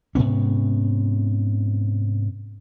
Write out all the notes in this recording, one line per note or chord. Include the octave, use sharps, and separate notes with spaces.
G#2 C3 B3 C#4